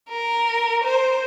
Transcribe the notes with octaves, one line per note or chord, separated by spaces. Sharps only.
A#4
C5